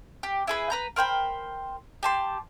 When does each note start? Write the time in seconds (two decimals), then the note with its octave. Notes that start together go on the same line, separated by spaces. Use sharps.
0.23 G4
0.47 E4 G#4 B4
0.70 B4 A#5 G6
0.96 A#4 C5 G5 B5
2.03 G4 A5 C6